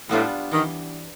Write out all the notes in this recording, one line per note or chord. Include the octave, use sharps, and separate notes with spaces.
A2 G3 B3 D4 F4
D#3 E3